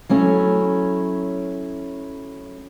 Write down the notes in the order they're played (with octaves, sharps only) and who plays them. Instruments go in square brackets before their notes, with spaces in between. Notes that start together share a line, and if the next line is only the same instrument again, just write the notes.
[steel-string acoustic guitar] F#3 A3 C#4 E4